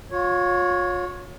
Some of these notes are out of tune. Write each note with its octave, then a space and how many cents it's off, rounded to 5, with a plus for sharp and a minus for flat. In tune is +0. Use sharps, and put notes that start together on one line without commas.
F4 +40 C#5 +0